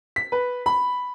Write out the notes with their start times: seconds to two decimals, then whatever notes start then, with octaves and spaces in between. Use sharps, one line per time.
0.16 B6
0.32 B4
0.66 B5